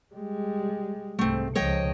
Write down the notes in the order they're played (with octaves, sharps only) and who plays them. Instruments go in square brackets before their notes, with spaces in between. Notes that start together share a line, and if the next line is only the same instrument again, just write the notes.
[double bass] G3 G#3
[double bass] C2 G#2 [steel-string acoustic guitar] A3 C4
[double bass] C#2 F3 [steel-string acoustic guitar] C#5 D#5 G5